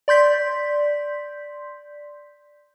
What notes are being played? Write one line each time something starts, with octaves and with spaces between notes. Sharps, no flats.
D5 C6 G6 B6